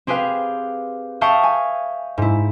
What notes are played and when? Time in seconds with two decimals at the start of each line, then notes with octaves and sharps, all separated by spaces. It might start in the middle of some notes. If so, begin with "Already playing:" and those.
0.07 C4 G4 G#4 B4 F5
1.21 E5 F5 G5 A5 C#6 D#6
1.43 G#5
2.18 G#2 E4